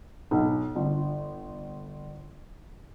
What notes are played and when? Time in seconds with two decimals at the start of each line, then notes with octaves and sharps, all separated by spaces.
0.31 B1
0.76 G1